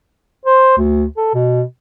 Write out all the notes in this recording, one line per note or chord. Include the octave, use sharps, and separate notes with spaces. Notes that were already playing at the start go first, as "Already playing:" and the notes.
C5
D2
A4
B2